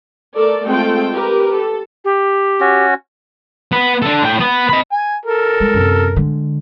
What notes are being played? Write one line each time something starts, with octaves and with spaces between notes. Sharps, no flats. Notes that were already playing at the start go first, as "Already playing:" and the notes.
A3 A4 A#4 D5
G#3 A3 C4 F4 A4 G5
G4 A#4 B4
A4
G4
C#4 F#4
B3 B4
D4 A4
A2 G5
B3
D#5 B5
G#5
A4 A#4
G#3
F#2 C3
D3 G#3